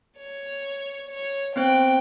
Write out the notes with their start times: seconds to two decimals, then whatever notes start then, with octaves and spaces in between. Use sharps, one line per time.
0.19 C#5
1.09 C#5
1.56 B3 C4 C5 G5